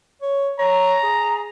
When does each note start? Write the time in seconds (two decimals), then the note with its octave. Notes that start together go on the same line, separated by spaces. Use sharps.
0.22 C#5
0.59 C#5 A#5
1.03 G#4